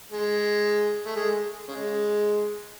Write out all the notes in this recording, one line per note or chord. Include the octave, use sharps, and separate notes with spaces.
G#3
A3
G#3
C#3 G#3